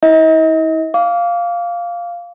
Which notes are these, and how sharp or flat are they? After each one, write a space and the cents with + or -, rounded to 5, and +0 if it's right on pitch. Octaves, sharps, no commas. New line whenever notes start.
E4 -40 D#5 +40
F5 +0 D6 -35